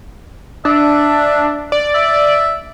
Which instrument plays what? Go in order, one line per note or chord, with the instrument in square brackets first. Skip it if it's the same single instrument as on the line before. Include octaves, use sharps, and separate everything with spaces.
[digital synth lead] D4 [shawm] E5
[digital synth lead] D5
[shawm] E5